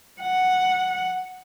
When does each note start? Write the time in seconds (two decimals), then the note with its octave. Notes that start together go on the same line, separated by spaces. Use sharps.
0.22 F#5